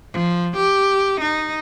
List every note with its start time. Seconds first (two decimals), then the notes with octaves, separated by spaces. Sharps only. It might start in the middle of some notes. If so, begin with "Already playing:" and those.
0.13 F3
0.57 G4
1.21 D#4